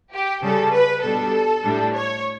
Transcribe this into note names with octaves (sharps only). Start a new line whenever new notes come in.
G4
C#3 G3 C#4 A4
B4
B2 G3 D4 A4
A2 G3 D4
C#5